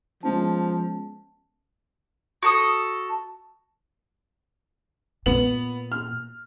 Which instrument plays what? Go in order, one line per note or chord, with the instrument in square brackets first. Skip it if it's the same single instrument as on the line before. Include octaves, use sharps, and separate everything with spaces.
[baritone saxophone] F3 [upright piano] G#3 B3 C#4 [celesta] A5
[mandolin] F#4 A4 D#6
[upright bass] A#2 [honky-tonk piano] B3 F#7
[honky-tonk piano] F6